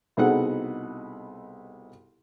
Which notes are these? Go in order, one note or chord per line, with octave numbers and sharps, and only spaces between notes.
C2 B2 D#4 G#4 A4 F#5